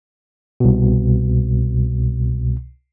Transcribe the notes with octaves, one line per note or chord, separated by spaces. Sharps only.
C2 B2